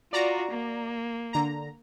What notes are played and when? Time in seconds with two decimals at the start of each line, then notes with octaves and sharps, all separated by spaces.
0.13 F4 F#4 D5 A#5
0.51 A#3
1.33 D3 A#5